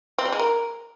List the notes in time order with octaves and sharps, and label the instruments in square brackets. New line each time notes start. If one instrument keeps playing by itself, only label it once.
[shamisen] C4
G3
G#3
A#4